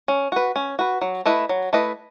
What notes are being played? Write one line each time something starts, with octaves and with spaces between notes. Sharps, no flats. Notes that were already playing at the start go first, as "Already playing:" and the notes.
C#4
F#4 B4
C#4
F#4 B4
F#3
A3 E4 B4 D#5
F#3
A3 E4 B4 D#5